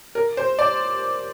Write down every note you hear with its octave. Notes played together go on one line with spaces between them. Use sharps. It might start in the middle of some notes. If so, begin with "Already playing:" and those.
A#4
C5
D5